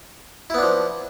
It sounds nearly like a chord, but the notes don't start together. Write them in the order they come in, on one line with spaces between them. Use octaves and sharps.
E4 B3 D4 F3